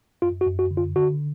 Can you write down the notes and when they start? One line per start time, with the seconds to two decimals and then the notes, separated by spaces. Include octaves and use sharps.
0.22 F#2 F4
0.41 F#4
0.47 F#2
0.59 F#4
0.71 D3
0.77 F4
0.96 D3 F#4